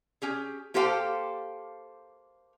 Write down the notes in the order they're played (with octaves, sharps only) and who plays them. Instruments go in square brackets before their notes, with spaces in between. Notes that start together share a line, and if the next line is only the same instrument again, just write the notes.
[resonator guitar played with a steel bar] C#4 G4 G#4
A#3 G4 A4 C5 F5 G5